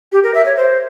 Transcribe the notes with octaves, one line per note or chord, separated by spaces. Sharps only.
G4
A#4
E5
C#5
C5